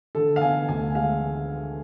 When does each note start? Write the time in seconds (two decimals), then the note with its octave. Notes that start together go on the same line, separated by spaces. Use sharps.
0.15 D3 A4
0.36 F5
0.41 B3 G#5
0.69 D2 G#5
0.95 G#3 F5